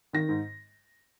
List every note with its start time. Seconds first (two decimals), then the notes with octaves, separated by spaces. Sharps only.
0.13 D#3 A#6
0.28 G#2